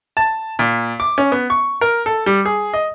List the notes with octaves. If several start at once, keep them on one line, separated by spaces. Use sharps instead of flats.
A5
A#2
D6
C#4
B3
C#6
A#4
A4
G3
G#4
D#5